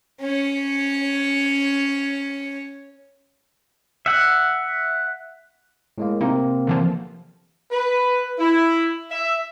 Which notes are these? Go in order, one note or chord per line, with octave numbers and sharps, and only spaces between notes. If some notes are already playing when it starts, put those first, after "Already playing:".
C#4 C#5
E5 F#5
A2 G#3 A#3
C3 A#3 C4 D#4
D3 E3 F3
B4
E4
E5